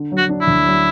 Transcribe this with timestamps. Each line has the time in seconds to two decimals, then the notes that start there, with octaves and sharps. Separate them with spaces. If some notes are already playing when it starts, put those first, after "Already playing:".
Already playing: D3
0.12 F#3
0.17 F#4
0.29 D4
0.41 E4
0.47 D2
0.66 F#3